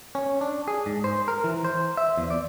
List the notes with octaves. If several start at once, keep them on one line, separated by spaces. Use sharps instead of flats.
C#4
D4
G#4
G#2
C5
A#4
E3
C5
E5
E2
D5